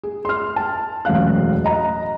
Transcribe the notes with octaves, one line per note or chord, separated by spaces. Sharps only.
G#4
C6 F6
A5
E1 F#2 A2 F5 F#6
D#5 A#5